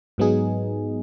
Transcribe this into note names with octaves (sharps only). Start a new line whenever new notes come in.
G#2 F#3 B3 D#4 G#4